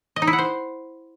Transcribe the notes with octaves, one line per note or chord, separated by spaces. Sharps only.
D#5
D#4
E4
F#5
C5